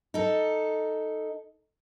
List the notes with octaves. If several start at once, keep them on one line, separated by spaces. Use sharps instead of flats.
D#4 A4